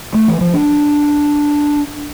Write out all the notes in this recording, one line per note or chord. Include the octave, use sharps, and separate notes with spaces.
A3
E3
F3
D4